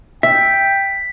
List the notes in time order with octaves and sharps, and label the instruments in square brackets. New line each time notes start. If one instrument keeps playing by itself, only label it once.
[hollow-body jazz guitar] E5 [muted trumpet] G5 [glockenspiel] B6